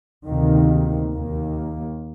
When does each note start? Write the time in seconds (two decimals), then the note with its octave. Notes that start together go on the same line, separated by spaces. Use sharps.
0.25 D2 C3 D#3 A#3
1.12 D#2 D#3 A#3